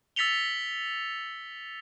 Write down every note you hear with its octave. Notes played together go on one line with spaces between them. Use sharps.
E6 A6 B6 C#7 F7 G7